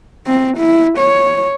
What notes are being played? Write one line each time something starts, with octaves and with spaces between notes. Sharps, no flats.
C4
E4
C#5